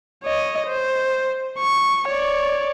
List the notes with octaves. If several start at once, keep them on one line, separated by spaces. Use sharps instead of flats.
C#5 D#5
C5
C#6
C#5 D5